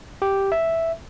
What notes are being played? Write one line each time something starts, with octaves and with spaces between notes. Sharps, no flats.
G4
E5